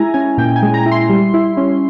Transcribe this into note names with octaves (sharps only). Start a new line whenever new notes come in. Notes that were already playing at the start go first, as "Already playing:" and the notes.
Already playing: G#3 E4 G#5 A#5
C#4 G#5
A#2 G5
G#5
G#3
A#5
E4
C6
G3
E4
C#4